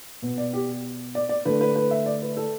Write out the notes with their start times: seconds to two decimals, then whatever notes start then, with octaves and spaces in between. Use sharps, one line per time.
0.22 B2 B3
0.38 D5
0.53 G4
1.15 D5
1.29 D5
1.45 D3 A3 B4
1.61 B4
1.75 B4
1.91 E5
2.06 D5
2.22 B4
2.37 A4